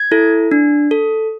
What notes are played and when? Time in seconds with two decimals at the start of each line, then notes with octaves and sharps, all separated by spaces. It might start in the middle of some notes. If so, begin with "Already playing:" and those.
Already playing: G#6
0.11 E4 A4
0.51 D4
0.91 A4